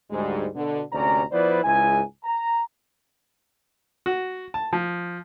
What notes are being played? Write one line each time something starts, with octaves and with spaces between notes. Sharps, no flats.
D2 G#2 G3 G#3
B2 D3
D2 G#2 C3 C#4 D5 A#5
F3 B3 E4 B4 C5 D5
C#2 G#2 G#3 E4 G#5
A#5
F#4
A5
F3